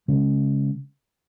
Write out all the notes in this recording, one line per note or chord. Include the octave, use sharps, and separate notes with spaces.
C#3 G#3 C#4